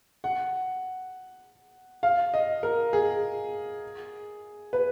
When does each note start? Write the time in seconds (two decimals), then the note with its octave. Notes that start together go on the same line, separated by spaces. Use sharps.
0.24 F#5
2.03 F5
2.34 D#5
2.63 A#4
2.93 G#4
4.73 B4